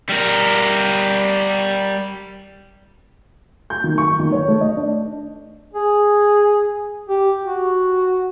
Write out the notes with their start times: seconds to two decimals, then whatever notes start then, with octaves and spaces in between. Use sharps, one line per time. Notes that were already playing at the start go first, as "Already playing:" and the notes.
0.09 G3 A#4
3.70 G6
3.84 D#3
3.98 C#6
4.19 D#3
4.32 C#5
4.48 A3
4.61 D#5
4.77 D4
5.73 G#4
7.10 G4
7.42 F#4